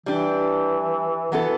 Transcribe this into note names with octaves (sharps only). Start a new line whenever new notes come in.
E3 G3 D4 G4
E3 F#3 B3 E4 A4